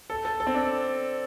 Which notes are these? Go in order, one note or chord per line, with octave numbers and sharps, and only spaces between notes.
A4
A4
A4
C4
D4